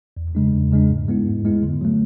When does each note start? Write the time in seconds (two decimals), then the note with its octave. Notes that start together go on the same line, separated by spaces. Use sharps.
0.17 E2
0.35 C#3 G#3 D4
0.53 E2
0.72 C#3 G#3 D4
0.90 G#2
1.08 G#3 B3 E4
1.27 G#2
1.45 G#3 B3 E4
1.63 D3
1.81 F#3 A3